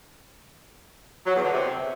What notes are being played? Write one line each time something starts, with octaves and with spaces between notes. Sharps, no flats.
F#3
E2
D3
C3